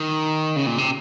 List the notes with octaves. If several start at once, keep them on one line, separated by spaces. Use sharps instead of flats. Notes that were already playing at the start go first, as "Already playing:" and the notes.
Already playing: D#3
C#3
A#2
C3